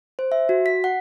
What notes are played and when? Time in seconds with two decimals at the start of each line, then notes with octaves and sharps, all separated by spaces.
0.19 C5
0.32 E5
0.49 F#4
0.66 B6
0.84 F#5